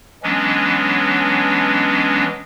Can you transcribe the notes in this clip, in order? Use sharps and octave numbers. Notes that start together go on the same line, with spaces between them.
E3 F#3 G#3 B3 C#4 D4